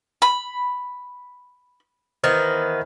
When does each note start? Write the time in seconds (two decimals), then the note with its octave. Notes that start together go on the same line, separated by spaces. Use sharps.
0.22 B5
2.24 D#3 E3 B3 C5 F6